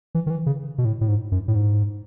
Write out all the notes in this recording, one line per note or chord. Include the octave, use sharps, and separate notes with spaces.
E3
D#3
E3
C#3
B2
A2
A2
G#2
F#2
A2
G#2